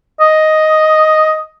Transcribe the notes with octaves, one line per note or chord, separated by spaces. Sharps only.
D#5